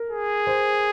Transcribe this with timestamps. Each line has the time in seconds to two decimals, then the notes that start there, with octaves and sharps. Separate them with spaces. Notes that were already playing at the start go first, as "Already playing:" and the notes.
Already playing: A#4
0.10 G#4
0.47 C5